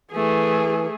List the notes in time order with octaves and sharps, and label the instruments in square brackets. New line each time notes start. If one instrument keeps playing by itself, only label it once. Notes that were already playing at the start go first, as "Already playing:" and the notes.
[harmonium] E3 [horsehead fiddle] A3 G#4